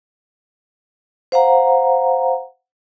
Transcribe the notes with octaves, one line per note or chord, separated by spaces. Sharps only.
C5 F5 F#5 A#5